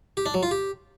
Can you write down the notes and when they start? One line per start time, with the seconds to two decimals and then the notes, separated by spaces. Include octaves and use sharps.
0.17 G4
0.26 D4
0.34 F#3
0.43 F4
0.51 G4